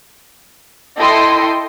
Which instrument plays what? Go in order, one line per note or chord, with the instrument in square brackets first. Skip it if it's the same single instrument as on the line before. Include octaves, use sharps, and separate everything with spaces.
[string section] E4 A4 D#5 G5 C6